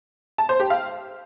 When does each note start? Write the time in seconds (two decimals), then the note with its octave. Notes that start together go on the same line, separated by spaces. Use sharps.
0.38 A5
0.49 C5
0.60 G4
0.70 F5